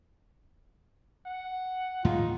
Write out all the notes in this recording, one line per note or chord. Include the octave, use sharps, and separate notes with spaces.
F#5
D#2 A2 G#3 D#4 F4